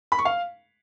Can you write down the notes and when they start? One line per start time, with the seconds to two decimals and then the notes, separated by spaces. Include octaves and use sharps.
0.12 B5
0.19 C#6
0.25 F5